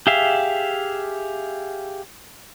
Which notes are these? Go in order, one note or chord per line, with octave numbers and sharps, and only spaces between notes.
G4 G#4 E5 F5